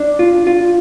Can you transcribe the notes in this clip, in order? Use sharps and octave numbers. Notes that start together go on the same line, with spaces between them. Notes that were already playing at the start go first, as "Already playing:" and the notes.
Already playing: D4
F4
F4